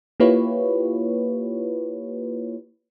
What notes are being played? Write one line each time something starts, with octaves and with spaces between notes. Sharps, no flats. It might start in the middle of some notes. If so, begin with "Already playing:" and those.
A#3 E4 F4 G4 B4 C#5